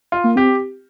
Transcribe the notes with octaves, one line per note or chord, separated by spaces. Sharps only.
F4
A#3
C4 G4